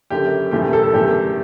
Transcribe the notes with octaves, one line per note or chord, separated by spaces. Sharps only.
F#1 F#2 D3 G4
F#1 E2 B2 A3 G4
G4
A4
A4
F#1 E2 D3 A3 G4